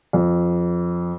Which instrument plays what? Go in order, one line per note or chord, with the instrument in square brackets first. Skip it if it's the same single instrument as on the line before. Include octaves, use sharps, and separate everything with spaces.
[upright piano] F2